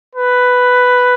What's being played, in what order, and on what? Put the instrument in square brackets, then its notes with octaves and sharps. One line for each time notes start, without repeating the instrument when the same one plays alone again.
[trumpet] B4